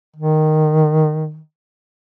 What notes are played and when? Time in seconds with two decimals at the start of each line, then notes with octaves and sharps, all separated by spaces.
0.16 D#3